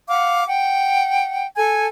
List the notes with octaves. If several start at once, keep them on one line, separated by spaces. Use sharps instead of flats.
F5 F#5 D6
F#5 G5
A4 G#5 G#6